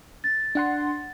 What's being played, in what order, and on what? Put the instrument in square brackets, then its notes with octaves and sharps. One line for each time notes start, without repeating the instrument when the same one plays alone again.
[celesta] A6
[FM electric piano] D4 F#5 C6